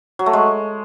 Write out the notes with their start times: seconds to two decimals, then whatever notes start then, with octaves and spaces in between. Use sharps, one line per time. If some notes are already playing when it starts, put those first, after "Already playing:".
0.19 F#3
0.26 A3
0.33 G#3